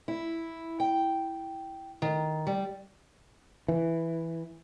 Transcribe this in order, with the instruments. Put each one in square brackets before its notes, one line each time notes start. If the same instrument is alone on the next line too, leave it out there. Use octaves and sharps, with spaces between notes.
[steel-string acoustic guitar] E4
G5
D#3
G3
[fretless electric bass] E3